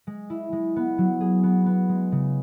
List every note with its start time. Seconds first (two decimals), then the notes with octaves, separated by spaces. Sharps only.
0.07 G#3
0.30 E4
0.52 G#3
0.76 B3
0.98 F#3
1.21 G#4
1.43 B3
1.66 B3
1.89 G#3
2.12 C#3